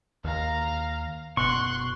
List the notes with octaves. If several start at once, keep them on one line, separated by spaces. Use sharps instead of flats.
D#2 F5 A#5
F#1 B2 C6 C#6 F#6